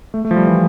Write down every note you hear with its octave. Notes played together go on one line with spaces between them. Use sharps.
A3
A3
F3
G3
E3